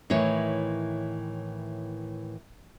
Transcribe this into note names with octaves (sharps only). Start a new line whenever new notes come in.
A2 D#3 E3 C#5